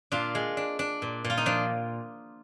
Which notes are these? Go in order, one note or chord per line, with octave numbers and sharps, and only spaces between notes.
A#2 D4 F4
G#3
D4
D4
A#2
A#2
F4
D#4
F3 D4